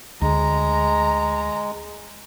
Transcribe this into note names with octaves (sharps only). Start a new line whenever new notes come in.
D2 G#3 A#5